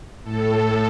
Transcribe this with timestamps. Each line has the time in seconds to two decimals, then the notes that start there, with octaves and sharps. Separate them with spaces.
0.24 A2 A4